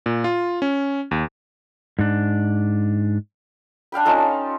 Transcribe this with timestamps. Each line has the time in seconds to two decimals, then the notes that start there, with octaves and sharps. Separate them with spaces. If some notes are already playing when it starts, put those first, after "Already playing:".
0.06 A#2
0.24 F4
0.62 C#4
1.11 D#2
1.99 G#2 D4
3.92 D4 F5 G5 B5
4.05 C#4 D#4 F4 A4